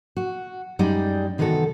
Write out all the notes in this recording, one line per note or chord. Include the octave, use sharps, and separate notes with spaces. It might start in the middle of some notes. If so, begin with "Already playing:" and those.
F#4
F#2 G3 G#3 D#4 D5 G5
C3 D#3 E3 B3 F#4 A4